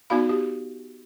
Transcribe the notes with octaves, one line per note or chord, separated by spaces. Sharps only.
B3 D#4 F#4 D5 F5 B5
G4